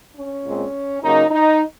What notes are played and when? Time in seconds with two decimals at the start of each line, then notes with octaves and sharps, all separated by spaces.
0.15 C#4
0.44 A#2 G#3 C4
1.01 C#3 F#3 A#3 C#4 D#4
1.30 D#4